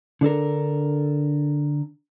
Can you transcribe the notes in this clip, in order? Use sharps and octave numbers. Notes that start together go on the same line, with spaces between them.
D3 D4 A4 A#4